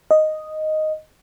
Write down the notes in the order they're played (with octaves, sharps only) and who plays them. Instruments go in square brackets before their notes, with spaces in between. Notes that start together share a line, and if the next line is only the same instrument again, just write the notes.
[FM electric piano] D#5